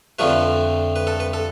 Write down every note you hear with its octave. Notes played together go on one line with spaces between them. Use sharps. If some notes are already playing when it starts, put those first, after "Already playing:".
F2 D3 F3 A3 B4
B4
A4
B4
A4